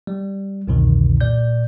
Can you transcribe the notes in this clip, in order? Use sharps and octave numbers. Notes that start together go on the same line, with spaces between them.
G3
C2 F2 B2 D3 D#3
A#2 D5 G6